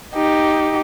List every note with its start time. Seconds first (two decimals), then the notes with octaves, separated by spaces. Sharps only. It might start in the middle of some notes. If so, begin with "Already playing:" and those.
0.14 D#4 G4